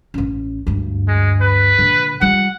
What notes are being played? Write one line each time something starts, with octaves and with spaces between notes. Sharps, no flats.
A1 C#4
D2 G2
G#3
B4
A#2 D3
G3 F4 F#5